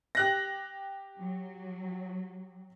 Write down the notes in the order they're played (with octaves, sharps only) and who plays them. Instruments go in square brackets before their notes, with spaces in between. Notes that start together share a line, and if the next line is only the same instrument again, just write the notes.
[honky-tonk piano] G4 F#6 A#6
[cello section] F#3